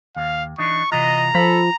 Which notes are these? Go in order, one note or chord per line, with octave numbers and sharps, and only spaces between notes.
D#2 F5
E3 D4 D#4 C#6
C3 E3 F4 D#5 A#5
F3 A4 B5